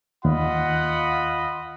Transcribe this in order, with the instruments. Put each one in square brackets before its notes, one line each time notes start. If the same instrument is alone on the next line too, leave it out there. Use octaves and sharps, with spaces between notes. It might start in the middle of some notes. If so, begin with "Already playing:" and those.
[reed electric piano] D#2 [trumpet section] F4 D#5 B5 [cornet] F#5